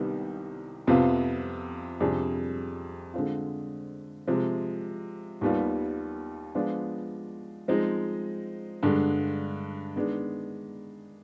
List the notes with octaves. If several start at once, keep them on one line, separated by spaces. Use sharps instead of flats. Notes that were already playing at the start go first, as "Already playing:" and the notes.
Already playing: C2 C3 D#3 G3 B3
F2 C3 F3 B3 F4
F2 C3 G3 D4 G#4
D3 G#3 C4 F4
C3 F3 G#3
D#2 D#3 G3 B3 F4
F3 G#3 B3 D4 F4
F3 G#3 C4 D#4
G2 D3 G#3
D#3 G#3 B3 D4